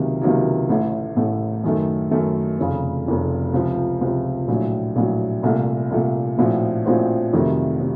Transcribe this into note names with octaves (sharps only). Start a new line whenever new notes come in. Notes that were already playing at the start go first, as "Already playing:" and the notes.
Already playing: C#2 C3 D#3 F#3 A#3
C#2 C3 D#3 F#3 A#3
A1 A2 A3
A1 A2 A3
F#2 D#3 A3
F#2 D#3 A3
F1 F2 C#3
F1 F2 C#3
C#2 C3 F3
C#2 C3 F3
A#1 A2 F#3
A#1 A2 F#3
C2 A#2 A3
C2 A#2 A3
A#1 A2 F3 C4 F#4
A#1 A2 F3 C4 F#4
F2 C3 D#3 F#3 A3
C3